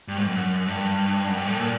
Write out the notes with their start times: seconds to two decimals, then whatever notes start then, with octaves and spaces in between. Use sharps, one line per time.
0.08 G2
0.18 G#2
0.27 F#2
0.67 G2
1.28 F#2
1.37 G2
1.47 A2
1.57 A#2